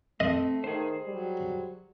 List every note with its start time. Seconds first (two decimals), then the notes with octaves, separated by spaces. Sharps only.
0.20 A3 C4 D#5
0.64 D#3 G#4 C5
1.06 F#3 G3